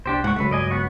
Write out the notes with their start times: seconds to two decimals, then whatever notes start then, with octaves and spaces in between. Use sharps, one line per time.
0.06 C2 D4 G4 C5
0.24 G#2 F#5 G5 C#6
0.36 C#2 F#2 F#3 A3 B4
0.51 G2 D5 D#5 G#5
0.71 B3 F#5 C#6